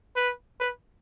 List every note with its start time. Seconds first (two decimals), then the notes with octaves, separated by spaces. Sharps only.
0.16 B4
0.60 B4